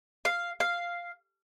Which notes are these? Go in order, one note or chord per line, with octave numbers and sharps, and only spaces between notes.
F5
F5